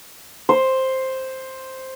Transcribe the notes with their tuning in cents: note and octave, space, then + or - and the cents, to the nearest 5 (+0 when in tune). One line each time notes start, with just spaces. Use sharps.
C5 +5